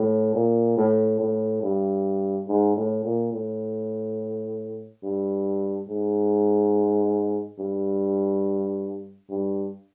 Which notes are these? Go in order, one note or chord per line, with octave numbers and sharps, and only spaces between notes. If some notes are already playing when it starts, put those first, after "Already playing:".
Already playing: A2
A#2
A2
A2
G2
G#2
A2
A#2
A2
G2
G#2
G2
G2